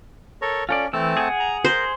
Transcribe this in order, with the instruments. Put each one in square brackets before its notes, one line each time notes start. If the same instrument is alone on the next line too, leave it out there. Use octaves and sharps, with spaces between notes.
[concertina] A4 A#4 C#5
[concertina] C#4 [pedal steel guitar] F4 A4 D5
[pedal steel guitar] E3 E6 [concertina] A3 C4 A5
[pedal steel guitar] G#4 F#5
[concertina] A#5
[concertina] A#4 [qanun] C5